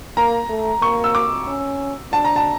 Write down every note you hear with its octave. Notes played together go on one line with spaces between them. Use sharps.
A#3 A#5
A3
A#3 C#6
E6
D6
C#4
D4 A5
A#5
A5